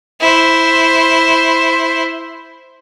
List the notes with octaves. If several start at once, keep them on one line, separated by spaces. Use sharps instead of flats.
E4 C5